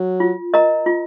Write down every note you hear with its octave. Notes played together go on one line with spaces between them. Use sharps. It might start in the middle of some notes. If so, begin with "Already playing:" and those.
Already playing: F#3
F4
A#4 D#5 A#5
F4